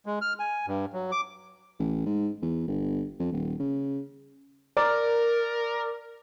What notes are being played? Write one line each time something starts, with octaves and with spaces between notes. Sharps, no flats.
G#3
F6
G#5
G2
F#3
D6
A1
G#2
E2
G1
F2
D#1
C#3
A#4 D5